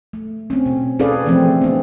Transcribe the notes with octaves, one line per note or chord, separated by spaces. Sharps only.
A3
C4 C#4
B2
C#4 G#4 A4 B4 D5 F5
D3 E3 F3 A3 C4
B3 D4